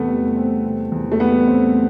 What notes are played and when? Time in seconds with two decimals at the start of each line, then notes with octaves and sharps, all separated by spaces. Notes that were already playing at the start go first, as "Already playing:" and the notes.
Already playing: E2 C3 A3 B3
0.08 G3
0.36 C4
0.64 C3
0.92 E2
1.12 A3
1.20 G3 B3
1.48 C4